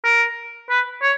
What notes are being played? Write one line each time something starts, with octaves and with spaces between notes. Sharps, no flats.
A#4
B4
C#5